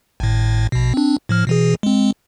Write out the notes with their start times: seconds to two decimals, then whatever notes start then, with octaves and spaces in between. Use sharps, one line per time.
0.20 G#1 A2
0.72 A#1 B2
0.94 C4 D4
1.29 A2 F3 F6
1.47 B2 E3 G#4
1.83 G#3 C4